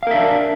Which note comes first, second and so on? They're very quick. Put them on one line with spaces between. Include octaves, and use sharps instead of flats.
F5 A#4 E5 D4